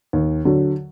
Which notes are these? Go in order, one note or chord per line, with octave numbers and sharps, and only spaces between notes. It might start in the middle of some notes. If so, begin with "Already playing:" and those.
D#2
D3 F#3